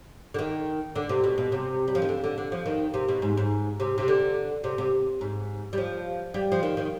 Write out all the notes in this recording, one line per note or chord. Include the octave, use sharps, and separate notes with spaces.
D3
D#3
D3
C3
B2
B2
C3
G3
F3
D#3
D3
D3
D3
F3
D#3
C3
B2
G#2
G#2
C3
C3
D3
C3
C3
G#2
G3
F3
G3
F3
D#3
D#3